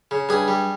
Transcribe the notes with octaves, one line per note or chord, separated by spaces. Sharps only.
C#3
G2 G#4
G3